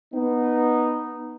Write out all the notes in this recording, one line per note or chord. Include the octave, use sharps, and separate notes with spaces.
B3 D#4